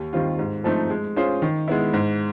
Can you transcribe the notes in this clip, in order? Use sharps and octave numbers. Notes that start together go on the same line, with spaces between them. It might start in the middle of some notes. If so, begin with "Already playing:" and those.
Already playing: D#2
D#3 G3 C4 F4
G#2
F3 A3 C4 D#4
G#3
C#4 F4 G#4 C5
D#3
G#3 B3 E4
G#2